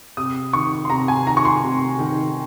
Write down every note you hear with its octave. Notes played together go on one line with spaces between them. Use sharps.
C3 D#6
D#3 C#6
C6
C3 A#5
G#5
D#3 A#5
C#6
C6
C3
D#3